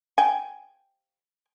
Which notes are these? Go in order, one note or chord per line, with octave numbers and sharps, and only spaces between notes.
G5 G#5